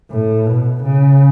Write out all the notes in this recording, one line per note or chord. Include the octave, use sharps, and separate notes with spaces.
A2
B2
C#3